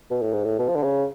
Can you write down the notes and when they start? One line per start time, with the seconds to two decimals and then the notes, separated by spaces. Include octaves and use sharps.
0.10 B2
0.22 A2
0.33 G#2
0.44 A2
0.59 B2
0.68 F3
0.76 D3
0.83 C#3